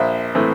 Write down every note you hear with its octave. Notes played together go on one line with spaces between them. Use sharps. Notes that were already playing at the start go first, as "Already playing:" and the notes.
Already playing: A#1 C5 E5
A2 E3 A3 C4